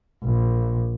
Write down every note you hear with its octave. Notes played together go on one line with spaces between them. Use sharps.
A#1